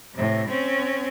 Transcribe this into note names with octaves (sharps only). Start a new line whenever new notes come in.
A2 C3
C4 C#4